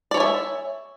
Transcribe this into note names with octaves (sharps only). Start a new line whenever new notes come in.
C#5 D5 E5 G#5